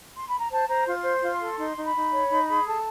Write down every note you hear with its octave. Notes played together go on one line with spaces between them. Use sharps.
C6
B5
A#5
C5 A5
C5 A#5
F4 C6
C5
F4
A4
D#4 C6
D#4
B5
D#4
C#5
D#4
G#4
A4 A5